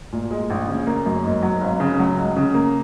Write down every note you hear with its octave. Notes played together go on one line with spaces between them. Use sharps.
A#2
G#3
A#1
C#3
A#3
F#2
G#2
F#3
G#1
C#3
F#3
C#2
C#3
A#3